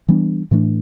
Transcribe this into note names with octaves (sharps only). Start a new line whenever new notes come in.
E3 G3 B3 D4
A2 E3 A3 D4